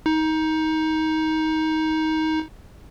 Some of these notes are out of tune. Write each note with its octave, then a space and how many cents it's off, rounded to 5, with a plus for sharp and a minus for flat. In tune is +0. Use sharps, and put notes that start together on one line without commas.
D#4 +20